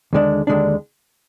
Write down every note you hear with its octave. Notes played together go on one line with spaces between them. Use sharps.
D#2 D3 G#3 D4
D#2 D3 G#3 D4